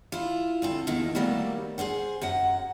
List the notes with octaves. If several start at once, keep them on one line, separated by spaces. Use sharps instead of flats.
E4 F4
D2 C4 A4
E2 A#2 D#3 G#3
D#3 F#3 G3 A3 A#3
G#4 A#4 C5 F#5
F#2 F#3 F#5